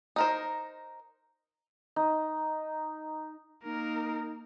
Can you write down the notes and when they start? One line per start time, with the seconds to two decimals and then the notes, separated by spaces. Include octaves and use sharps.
0.16 D#4 A#4 C5
1.96 D#4
3.64 A#3 D#4 A#4